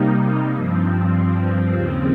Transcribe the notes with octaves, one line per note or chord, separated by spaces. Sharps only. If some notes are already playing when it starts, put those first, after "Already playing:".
Already playing: C3 G3 A#3 D#4
G2 F3 C4
D#2 C#3 F3 C4